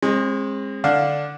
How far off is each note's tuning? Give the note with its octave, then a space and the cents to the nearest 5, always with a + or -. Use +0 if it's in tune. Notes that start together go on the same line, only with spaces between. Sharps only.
G#3 -15 C4 +40
D3 +0 D4 +0 F5 +0